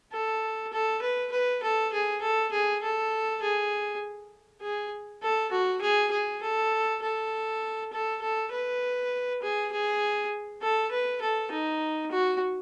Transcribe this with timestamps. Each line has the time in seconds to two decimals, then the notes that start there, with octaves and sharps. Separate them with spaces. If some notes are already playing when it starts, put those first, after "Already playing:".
0.12 A4
0.73 A4
1.02 B4
1.32 B4
1.63 A4
1.93 G#4
2.22 A4
2.52 G#4
2.83 A4
3.42 G#4
4.62 G#4
5.23 A4
5.52 F#4
5.81 G#4
6.12 G#4
6.42 A4
7.02 A4
7.92 A4
8.21 A4
8.52 B4
9.42 G#4
9.72 G#4
10.62 A4
10.92 B4
11.22 A4
11.51 D#4
12.11 F#4